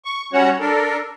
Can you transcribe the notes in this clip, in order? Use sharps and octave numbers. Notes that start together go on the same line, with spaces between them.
C#6
G3 C#4 F#4 C#5 F#5
D4 A4 A#4